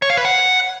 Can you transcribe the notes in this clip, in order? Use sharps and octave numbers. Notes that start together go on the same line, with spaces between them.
C#5
F5
B4
F#5